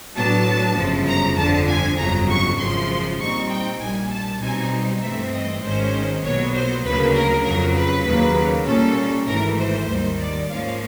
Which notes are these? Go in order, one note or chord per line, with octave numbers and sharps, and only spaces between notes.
A2 F#3 B3 D4 A5
G1 F#2 C#3 F3
A#5
G1 F2 D3 F3 A5
G#5
G1 F2 C#3 F#3 A#5
C#6
G#1 F#2 C#3 F3 C6
A#2 G3 C4 D#4 C#6
G5
A#1 A#2 G3 G#5
A5
B1 B2 G3 C4 D#4 G#5
G2 E3 A3 C4 E5
D#5
G#1 G#2 D#3 G#3 C#4 C5
B1 A#2 F#3 B3 C#5
C5
D2 C#3 F#3 A#3 B4
A#4
F2 C#3 F#3 A#4
B4
D#2 C#3 F#3 A#3
A#2 G3 A#3 C#4 A4
G#1 G#2 E3 A3 A#4
C5
D#2 D#3 G3
D5
G#2 F3 A#3 C#4 F5